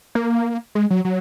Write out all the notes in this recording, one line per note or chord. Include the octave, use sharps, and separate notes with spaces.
A#3
G#3
F#3
F#3